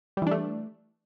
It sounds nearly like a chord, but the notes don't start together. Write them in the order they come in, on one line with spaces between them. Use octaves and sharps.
G3 E3 D4 A3